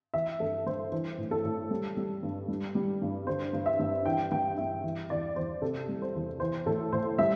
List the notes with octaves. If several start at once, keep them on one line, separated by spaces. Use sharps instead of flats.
E3 E5
G2 A4
G2 C5
E3 C5
A2
A4
A2
G3
G3
G2
G3
G3
G2
D3 C5
G2
E5
G2
E3 G5
G2 G5
G2 E5
E3
E2 D5
E2 C5
C3 A4
G3
C5
E2
E3 C5
A2 A4
A2 C5
G3 E5